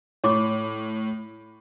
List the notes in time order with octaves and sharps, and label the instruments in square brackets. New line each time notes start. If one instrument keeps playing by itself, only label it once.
[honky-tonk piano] A2 [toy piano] C#5 C#6 D6